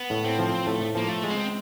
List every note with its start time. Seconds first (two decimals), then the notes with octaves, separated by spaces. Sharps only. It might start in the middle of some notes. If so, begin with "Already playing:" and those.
Already playing: B3
0.10 A2
0.25 C4
0.39 F3
0.67 A2 A3
0.95 F3 A#3
1.09 A3
1.24 G#3
1.30 C4